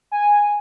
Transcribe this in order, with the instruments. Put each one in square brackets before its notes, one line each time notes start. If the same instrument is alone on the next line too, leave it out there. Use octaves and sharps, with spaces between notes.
[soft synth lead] G#5